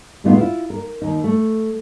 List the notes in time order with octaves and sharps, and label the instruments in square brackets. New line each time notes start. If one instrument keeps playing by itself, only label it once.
[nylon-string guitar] A2 D3 G#3 B3 D#4 F4
E4 F4
A#4
D#2 D#4
A3